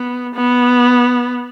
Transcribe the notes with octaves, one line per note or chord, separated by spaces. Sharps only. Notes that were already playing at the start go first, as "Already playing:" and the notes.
Already playing: B3
B3